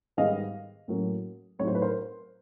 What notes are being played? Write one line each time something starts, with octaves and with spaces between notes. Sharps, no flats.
G#2 D#3 G3 B3 D#5 F5
A2 F#3 A#3 C#4
A2 F#3 A3 C4 D#4 C#5
C5
B4
A#4 C5